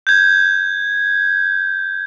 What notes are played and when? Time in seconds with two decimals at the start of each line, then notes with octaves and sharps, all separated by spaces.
0.07 G6 G#6